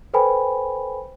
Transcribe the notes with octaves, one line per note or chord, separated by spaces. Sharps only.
A4 B4 C5 G5 G#5 B5